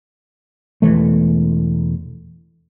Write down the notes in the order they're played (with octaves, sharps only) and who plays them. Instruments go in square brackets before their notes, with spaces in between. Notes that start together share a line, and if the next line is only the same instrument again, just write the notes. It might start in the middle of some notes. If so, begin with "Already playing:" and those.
[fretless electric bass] E1 E3 A3